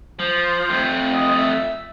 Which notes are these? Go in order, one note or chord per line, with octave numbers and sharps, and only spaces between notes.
F3 C5
F2 A3
D#5
E5